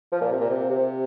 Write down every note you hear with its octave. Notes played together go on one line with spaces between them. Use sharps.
F3
A#2
C3
A#2
C3
C3